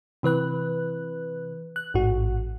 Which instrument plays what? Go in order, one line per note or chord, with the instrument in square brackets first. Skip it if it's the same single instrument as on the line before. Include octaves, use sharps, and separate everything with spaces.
[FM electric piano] C3 E3 B4 F#6
F#6
A1 G#2 F#4